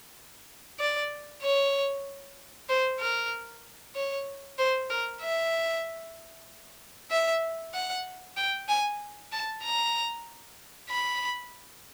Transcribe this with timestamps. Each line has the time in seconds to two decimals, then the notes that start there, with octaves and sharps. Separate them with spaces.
0.79 D5
1.43 C#5
2.69 C5
3.00 A#4
3.95 C#5
4.58 C5
4.90 A#4
5.21 E5
7.11 E5
7.74 F#5
8.37 G5
8.69 G#5
9.32 A5
9.63 A#5
10.90 B5